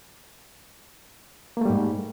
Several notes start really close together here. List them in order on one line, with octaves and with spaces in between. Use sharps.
A#3 A3 G3 G#2